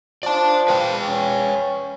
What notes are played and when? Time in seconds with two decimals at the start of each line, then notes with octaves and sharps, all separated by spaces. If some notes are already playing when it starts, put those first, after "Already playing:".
0.23 F3 D5 A5
0.68 B4 F5 G5
1.09 C#4